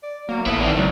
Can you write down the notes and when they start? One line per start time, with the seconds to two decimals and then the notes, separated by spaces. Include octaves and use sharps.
0.03 D5
0.29 F#3 A#3
0.46 A1 B3 E4 A4
0.60 D#3 C4 D5
0.77 C#2 F#3